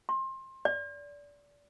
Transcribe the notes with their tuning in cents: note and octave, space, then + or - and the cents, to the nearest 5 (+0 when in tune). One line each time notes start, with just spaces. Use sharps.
C6 +25
D5 -25